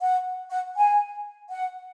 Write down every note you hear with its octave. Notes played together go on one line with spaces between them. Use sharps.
F#5
F#5
G#5
F#5